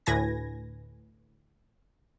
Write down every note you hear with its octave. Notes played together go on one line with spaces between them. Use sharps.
D2 A2 B4 G#5 G#6 A#6